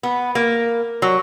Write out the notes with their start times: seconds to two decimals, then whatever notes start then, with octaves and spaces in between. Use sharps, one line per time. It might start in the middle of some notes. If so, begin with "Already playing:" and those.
0.03 B3
0.35 A#3
1.02 F#3